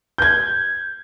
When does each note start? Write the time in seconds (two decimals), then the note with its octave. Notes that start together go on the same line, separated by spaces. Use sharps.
0.18 G6 G#6